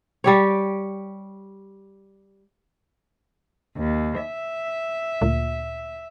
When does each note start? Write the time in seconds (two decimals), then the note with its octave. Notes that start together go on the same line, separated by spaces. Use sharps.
0.24 G3 G4 C#5
3.76 D#2
4.20 E5
5.21 D2 A#2